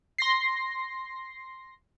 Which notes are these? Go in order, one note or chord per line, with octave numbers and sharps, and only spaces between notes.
C6 A#6 C7